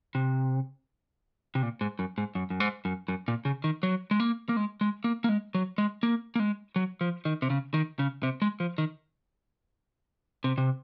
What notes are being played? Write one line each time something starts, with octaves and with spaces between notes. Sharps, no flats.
C3
C3
A#2
G#2
F#2
G#2
F#2
F#2
G#2
F#2
F#2
A#2
C#3
D#3
F#3
G#3
A#3
A#3
G#3
G#3
A#3
A#3
G#3
F#3
G#3
A#3
A#3
G#3
F#3
F3
D#3
C3
C#3
D#3
C#3
C3
G#3
F3
D#3
C3
C3